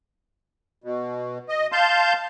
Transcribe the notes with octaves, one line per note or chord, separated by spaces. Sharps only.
B2
D#5
F5 A5 C6 G6